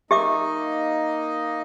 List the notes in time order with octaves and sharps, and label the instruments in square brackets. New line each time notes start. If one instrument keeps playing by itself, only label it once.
[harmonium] A#3 D#4 D#5 [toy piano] G4 E5 D6